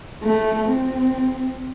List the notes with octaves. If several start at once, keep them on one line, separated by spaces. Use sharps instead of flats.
A3
C4